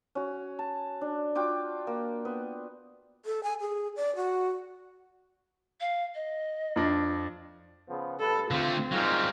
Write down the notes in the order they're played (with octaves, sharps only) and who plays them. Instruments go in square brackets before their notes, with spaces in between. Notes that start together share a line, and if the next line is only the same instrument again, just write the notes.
[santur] C#4 F#4
A5
D4
F4 F#4 G5 D6
A#3
B3
[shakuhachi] A4
G#5
G#4
D5
F#4
[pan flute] F5
D#5
[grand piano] F2 D4 A#6
[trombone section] C#3 F3 B3
[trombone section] G2 B4 [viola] A4
[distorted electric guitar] D3 A3 [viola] C4 [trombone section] F4
[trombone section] G#2 D#3 F4 [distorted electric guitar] F#3 G3